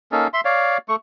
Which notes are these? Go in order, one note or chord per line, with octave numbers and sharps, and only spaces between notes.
A#3 C#4 D#4 A4
E5 C6
C#5 D5 F5
A3 C#6